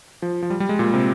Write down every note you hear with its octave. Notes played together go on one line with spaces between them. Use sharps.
F3
F3
G3
G3
G#3
A#2
C3